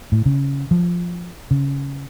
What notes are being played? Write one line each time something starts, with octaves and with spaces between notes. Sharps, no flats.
A2
C#3
F3
C#3